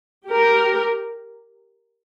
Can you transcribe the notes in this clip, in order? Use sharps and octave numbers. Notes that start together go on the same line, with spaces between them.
G4 A#4